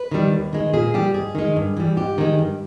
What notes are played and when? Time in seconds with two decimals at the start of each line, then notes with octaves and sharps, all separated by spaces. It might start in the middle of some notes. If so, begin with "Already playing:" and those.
Already playing: B4
0.11 D#3 G3
0.33 D#2
0.53 D#3 G#3
0.73 A#2 G#4
0.94 G3 G4
1.14 G#2 G#4
1.35 D#3 G#3
1.56 G2
1.77 E3 G3
1.97 G#2 G4
2.18 D#3 G#3
2.38 G2